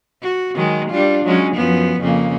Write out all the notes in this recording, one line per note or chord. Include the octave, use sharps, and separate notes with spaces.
F#4
D#3 F#3 G#3
G3 D4 F4
F#3 G#3 C#4
F#2 F3 B3
F2 C#3 A#3